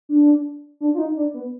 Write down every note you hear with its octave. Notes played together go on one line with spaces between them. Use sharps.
D4
D4
F4
D#4
D4
B3